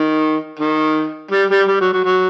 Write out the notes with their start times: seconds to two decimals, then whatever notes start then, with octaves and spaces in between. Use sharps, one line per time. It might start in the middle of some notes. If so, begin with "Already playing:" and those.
Already playing: D#3
0.59 D#3
1.31 G3
1.50 G3
1.68 G3
1.81 F#3
1.93 F#3
2.04 F#3